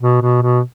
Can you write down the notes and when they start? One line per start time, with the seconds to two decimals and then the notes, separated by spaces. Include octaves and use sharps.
0.01 B2
0.22 B2
0.42 B2